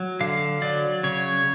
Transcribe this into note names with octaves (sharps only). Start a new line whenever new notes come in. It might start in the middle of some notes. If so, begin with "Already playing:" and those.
Already playing: F#3
D3 F5
F#3 D5
C#3 C#5